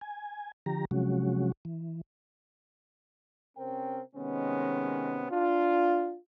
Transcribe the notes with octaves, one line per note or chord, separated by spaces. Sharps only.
G#5
D3 F3 G4 A#5
C3 F3 F#3 G#3 C#4 F#4
E3
C3 C4 C#4 A#4 G5
C3 D#3 G#3 B3 C#4
D4 F4